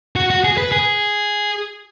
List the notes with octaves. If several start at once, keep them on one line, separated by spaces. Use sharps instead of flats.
F#4
F#4
G#4
B4
G#4